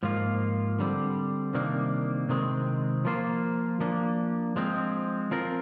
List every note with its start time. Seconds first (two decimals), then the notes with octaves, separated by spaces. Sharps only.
0.03 G#2 F3 A#3 F4
0.79 D3 G3 C4
1.54 C3 D#3 G3 A#3 D4
2.29 C3 D#3 G#3 C4
3.05 F3 A#3 F4 C5
3.80 F3 A#3 D4
4.56 F3 G#3 C4
5.31 F3 C4 F4 A#4